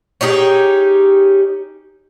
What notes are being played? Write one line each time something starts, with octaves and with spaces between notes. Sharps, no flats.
C#4 D#4 G4 G#4